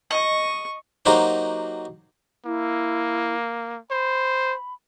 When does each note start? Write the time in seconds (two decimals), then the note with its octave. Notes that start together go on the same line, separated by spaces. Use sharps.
0.11 D#5 C#6
1.05 F#3 A#3 D#4 F#4 G4 C5
2.45 A#3 E4
3.91 C5 B5